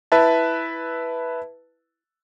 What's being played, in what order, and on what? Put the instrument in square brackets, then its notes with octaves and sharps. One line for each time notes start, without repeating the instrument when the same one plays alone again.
[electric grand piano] E4 B4 E5 A5